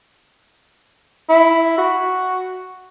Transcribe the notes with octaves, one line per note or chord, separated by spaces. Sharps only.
E4
F#4